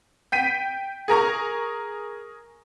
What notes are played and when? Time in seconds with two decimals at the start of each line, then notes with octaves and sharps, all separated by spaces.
0.32 G5 B6 D#7
1.08 G#4 A#4 A#5 C#6